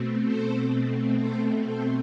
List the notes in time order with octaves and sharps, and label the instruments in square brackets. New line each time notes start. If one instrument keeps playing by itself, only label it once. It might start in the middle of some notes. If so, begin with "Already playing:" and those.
Already playing: [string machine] B2 A3 C4
A4 C5
A4 C5
A4 C5